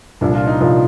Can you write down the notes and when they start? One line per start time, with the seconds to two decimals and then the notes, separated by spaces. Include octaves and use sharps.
0.21 C2 A#2 F3 D4
0.35 F4
0.47 D#4
0.61 C2 A#2 F3